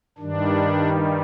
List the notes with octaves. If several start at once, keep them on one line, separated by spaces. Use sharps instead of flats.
G2 D#3 G3 D4